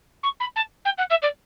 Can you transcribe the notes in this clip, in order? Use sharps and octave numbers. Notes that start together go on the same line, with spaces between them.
C#6
B5
A5
G5
F#5
E5
D5